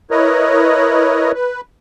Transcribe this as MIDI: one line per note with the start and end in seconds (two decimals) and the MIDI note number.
0.11 1.32 64
0.11 1.32 70
0.11 1.32 71
0.11 1.32 73
0.11 1.32 75
1.34 1.61 71